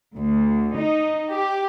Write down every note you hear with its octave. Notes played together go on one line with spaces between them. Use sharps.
D2
D#4
G4